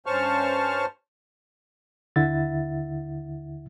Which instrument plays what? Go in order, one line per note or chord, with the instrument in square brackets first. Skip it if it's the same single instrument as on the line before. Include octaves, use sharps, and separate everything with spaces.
[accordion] G2 C#4 C5 A5 C#6 F6
[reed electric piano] D#2 D3 E4 E5 F#5 A6